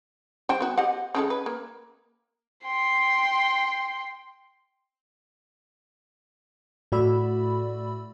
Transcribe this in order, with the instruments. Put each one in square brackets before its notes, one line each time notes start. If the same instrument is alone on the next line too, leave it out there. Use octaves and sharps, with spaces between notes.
[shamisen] G3 C5 G5
B3 F#4
G4 D#5 F#5
C#3 G#3 A4
B4
A#3
[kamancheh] G5 C6
[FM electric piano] A2 A3 F#4 D5 B5 E6